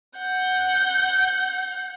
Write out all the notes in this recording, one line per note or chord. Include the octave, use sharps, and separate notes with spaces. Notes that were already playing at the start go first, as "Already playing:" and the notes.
F#5 G6